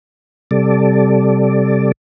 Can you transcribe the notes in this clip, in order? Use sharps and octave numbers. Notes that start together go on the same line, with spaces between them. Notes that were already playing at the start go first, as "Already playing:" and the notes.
C3 G3 A4 D5